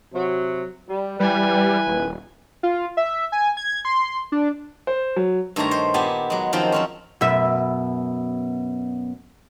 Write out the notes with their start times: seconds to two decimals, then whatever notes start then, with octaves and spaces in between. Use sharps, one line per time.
0.13 C3 F#3
0.89 G3
1.20 E3 G3 B4 G#5
1.87 D#1
2.63 F4
2.97 E5
3.32 G#5
3.57 G#6
3.85 C6
4.32 D4
4.87 C5
5.16 F#3
5.56 G2 D#3 A3 C5 C#5 A#5
5.71 C5
5.94 A#2 B3 G4 G#5 A5
6.30 F#3 G#3
6.53 F#2 D#3 F3 C4 F4 G5
6.72 F3 C4 C#4
7.21 F#2 B2 E5